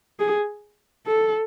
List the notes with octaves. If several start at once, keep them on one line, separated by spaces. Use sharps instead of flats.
G#4
A4